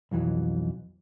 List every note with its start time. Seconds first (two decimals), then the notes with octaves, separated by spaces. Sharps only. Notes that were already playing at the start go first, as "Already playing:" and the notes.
0.11 B1 F2 E3 F#3